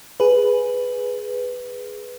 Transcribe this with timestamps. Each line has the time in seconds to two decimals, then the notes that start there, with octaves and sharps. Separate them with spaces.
0.20 G#4 B4